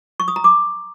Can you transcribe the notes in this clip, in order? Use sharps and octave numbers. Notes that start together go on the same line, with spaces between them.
C#6
D#6
A#5
D6